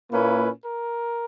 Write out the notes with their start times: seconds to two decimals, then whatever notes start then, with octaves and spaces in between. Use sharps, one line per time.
0.12 A#2 A#3 C#4 E4 B4
0.64 A#4